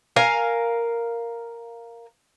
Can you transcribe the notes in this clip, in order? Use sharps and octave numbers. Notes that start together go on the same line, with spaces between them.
A#4 F5 G#5 A#5